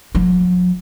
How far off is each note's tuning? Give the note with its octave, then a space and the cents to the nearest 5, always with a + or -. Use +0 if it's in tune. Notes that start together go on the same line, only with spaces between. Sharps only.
F#3 -45